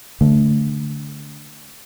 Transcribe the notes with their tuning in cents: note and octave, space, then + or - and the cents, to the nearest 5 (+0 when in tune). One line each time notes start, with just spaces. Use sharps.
D3 -10 A3 +0